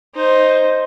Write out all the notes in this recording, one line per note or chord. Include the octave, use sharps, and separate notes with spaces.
D#4 C5